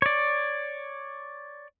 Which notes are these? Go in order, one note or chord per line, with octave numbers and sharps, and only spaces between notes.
C#5 D5